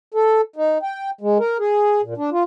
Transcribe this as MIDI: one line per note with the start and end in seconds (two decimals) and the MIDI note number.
0.14 0.41 69
0.56 0.78 63
0.83 1.10 79
1.21 1.38 56
1.39 1.57 70
1.59 2.01 68
2.03 2.14 46
2.17 2.30 62
2.32 2.43 65